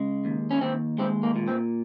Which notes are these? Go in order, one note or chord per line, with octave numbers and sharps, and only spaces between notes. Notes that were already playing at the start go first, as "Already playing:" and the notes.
Already playing: C#3 G#3
D#2
C#4
D#2 C4
G#3 C4
A#3
A#2
C4